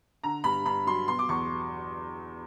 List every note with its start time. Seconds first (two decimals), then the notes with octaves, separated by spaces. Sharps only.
0.24 D3 A#5
0.44 G2 B5
0.66 G2 B5
0.87 F#3 C6
1.08 B2 C6
1.19 D6
1.29 E2 C#6